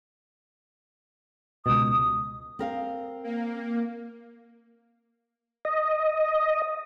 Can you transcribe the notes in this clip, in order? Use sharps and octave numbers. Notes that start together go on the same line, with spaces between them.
C#2 B2 D#6
C4 A#4 F5
A#3
D#5